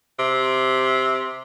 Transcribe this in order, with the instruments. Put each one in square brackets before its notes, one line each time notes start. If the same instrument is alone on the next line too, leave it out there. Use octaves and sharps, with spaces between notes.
[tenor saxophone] C3